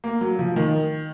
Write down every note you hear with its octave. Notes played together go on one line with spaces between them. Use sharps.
A#3
F#3
F3
D#3